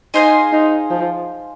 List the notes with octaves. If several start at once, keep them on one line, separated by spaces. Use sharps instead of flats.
D#4 G#4 C5 F5 G#5
D#4
F3